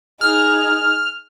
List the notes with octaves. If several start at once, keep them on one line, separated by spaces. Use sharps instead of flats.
D#4 G#4 F6